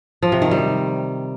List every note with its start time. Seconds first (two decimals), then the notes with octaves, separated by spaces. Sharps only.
0.23 F3
0.32 C3
0.42 D#3
0.51 G3